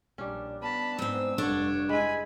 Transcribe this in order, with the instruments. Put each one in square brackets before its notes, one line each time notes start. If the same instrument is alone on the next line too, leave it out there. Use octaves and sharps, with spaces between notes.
[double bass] A#1 D4 [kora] G3 C#4
[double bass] B3 D4 [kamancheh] A5 B5
[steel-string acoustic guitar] G#2 C4 [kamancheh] E6
[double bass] F1 G2 [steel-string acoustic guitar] D4 [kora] A4 F#5 [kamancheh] C#5
[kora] G#3 E4 [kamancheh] G#5 B5